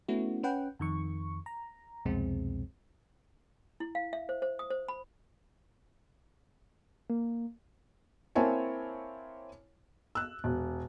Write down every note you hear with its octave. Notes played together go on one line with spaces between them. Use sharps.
A3 B3 C#4 E4 F#4
C#4 B4 F#5 G5
F2 D#3 C#6
A#5
C2 F2 B2 G#3 C4
E4
F5
E5
C5
C5
D#6
C5
B5
A#3
A#3 C4 E4 C#5 G#5 A5
E6 F#6
E1